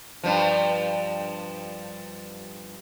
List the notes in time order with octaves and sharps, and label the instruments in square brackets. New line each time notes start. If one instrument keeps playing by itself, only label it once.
[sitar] G2 F3